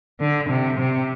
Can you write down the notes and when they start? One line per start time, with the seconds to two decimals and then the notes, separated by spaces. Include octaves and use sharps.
0.20 D3
0.49 C3
0.79 C3